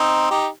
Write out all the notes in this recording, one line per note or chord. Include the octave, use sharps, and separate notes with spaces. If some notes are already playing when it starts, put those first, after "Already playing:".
Already playing: C4 D#4
D#4 G4